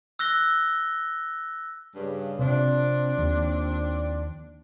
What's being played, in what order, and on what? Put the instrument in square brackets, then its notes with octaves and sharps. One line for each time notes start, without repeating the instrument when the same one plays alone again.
[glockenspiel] E6 F#6 A#6 G7
[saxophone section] G2 C#3
[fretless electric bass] C3 [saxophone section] F3 C4 D4
[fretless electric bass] D#2